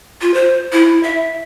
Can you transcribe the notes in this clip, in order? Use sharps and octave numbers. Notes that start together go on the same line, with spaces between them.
F4
C5
E4
E5